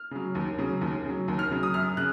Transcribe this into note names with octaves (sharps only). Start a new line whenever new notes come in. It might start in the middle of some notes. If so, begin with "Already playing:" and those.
Already playing: F6
C#3 F#3
D#2
C#3 F#3
D#2
C#3 F#3
D#2
F6
C#3 F#3
D#6
F#2 F6
C#3 F#6